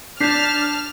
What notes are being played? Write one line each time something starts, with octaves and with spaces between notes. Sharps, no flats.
D4 A5 F6 G6 B6 C7